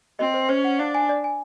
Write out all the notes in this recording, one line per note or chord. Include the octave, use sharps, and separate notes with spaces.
C4 D#5
C5
C#4 C5
F#5
D4 F5
G#5
D5
G#5